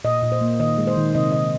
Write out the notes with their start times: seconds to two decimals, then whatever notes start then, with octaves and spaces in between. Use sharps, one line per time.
0.04 A#2 D#5
0.22 A#2
0.32 C5
0.41 A#3
0.59 D#3 D#5
0.78 G#3
0.87 C5
0.96 D#3
1.15 C3 D#5
1.32 C3 D#5